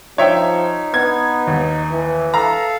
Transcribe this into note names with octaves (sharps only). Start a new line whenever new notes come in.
F3 D#4 C#5 E5 G5
B3 G#6
D#2
E3
A4 F5 A#5